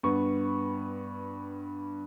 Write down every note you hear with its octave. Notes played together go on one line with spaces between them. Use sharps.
G2 B3 C#6